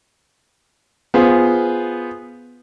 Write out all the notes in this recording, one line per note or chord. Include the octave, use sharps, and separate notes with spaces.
B3 F4 G#4 C5